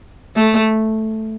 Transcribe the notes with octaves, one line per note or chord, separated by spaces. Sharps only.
A3